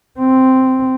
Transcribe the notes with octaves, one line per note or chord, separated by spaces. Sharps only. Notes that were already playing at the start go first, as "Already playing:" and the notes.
C4